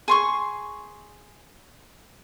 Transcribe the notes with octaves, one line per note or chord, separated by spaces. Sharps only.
G#4 C6 C#6